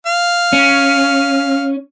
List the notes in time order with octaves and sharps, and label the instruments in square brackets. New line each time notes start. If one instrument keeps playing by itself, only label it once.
[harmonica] F5
[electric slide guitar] C#4